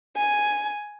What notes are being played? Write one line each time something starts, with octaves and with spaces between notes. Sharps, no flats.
G#5